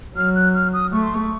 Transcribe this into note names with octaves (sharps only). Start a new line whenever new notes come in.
F#3 F6
F#6
F6
D#6
A3 C#6
C6
C#6